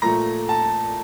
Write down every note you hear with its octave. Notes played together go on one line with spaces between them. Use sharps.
A#2 F3 A3 A#5
A5